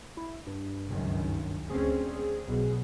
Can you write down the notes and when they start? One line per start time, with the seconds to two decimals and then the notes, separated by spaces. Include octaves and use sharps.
0.17 E4
0.47 G2
0.88 C#2 F#2 D#3
1.70 D2 C4 C#4 G#4
2.45 B1 B2